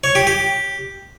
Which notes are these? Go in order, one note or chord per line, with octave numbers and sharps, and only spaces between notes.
C#5
G4
G4